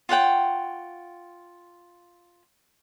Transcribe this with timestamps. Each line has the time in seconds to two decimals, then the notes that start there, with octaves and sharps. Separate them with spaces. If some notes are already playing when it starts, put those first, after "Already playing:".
0.09 F4 C#5 F#5 G5